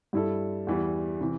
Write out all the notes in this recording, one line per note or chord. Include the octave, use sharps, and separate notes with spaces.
G2 G3 E4 A4
E2 E3 G3
C3 E3